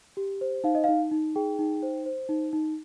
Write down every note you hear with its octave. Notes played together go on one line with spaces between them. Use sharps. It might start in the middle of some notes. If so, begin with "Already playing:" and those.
G4
C5
D#4 F5
D#5
D#4 F5
D#4
G#4 G5
D#4
C5
C5
D#4
D#4